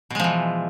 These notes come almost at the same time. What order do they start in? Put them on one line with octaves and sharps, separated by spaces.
B2 G#3 F3 E3